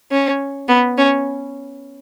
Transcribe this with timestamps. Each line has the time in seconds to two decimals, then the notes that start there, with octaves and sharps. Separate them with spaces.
0.11 C#4
0.68 B3
0.98 C#4